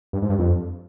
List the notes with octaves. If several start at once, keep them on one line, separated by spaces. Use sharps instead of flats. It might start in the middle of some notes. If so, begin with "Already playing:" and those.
G2
G#2
G2
F2